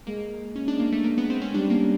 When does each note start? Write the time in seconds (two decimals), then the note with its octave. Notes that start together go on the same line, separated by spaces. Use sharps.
0.06 G#3 A#3
0.55 C#4
0.68 D4
0.80 A#3
0.92 A3
1.04 A#3
1.18 B3
1.30 C4
1.41 C#4
1.54 G3 D4
1.70 A#3